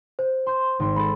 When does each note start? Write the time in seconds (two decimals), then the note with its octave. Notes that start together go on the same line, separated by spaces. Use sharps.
0.19 C5
0.46 C6 G6
0.79 G#1 C6
0.96 G#3 A4 B5